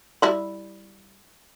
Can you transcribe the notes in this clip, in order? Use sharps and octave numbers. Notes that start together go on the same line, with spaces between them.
G3 E4 B5